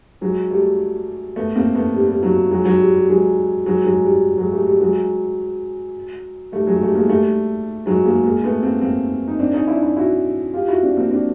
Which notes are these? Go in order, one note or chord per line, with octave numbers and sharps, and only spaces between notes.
F#3 G#3
G3 A3
A3 B3
A#3 C4
A3 B3
G3
G3
F#3
F#3 G#3
F#3
G3
G3
F#3 G#3
F#3 G#3
F#3 G#3
G3
F#3 G#3
G3 A3
G3
F#3 G#3
G3 A3
F#3 G#3
G3 A3
G#3 A#3
G3 A3
F#3 G#3
G#3 A#3
G#3 A#3
A3 B3
A#3 C4
A#3 C4
D#4
C4 D4
C#4 D#4
D4 E4
D4 E4
E4 F#4
F4 G4
E4 F#4
C4 D4
A#3 C4
C4 D4